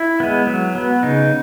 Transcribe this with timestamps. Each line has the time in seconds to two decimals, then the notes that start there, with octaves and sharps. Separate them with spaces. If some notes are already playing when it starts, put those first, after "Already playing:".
Already playing: E4
0.20 G#3 B3
0.47 F#3
0.75 B3
1.03 C#3 D#4